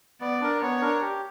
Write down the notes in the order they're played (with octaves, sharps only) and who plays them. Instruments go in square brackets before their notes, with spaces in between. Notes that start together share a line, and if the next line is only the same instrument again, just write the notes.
[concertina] B3 [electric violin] D5
[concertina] D4 A#4
[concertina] B3 [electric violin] C#5
[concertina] D4 A#4
G4